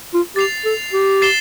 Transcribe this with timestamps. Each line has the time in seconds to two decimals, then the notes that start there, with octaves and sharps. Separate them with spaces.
0.14 F4
0.36 G4 A6 C7 F7
0.65 A4
0.93 G4
1.22 A6 C7 E7 G7